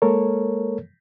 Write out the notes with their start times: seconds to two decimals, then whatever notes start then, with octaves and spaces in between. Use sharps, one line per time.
0.02 G#3 A#3 A4 A#4 C#5